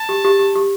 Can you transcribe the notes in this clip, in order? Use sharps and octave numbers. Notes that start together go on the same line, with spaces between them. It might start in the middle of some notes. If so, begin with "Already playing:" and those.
Already playing: A5
G4
G4
G4
G4